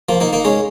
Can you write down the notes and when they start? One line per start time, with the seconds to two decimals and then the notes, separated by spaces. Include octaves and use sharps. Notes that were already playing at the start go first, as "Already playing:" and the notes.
0.09 F3 A#3
0.20 A#3 D#4
0.33 A#3 D#4
0.45 G#3 C#4